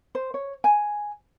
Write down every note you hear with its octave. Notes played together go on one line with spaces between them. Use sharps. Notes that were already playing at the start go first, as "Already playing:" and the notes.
C5
C#5
G#5